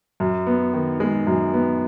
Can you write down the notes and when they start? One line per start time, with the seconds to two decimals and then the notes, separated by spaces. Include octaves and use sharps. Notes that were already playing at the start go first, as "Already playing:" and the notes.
0.20 F#2
0.47 B3
0.74 D#3
1.00 G#3
1.27 F#2
1.54 B3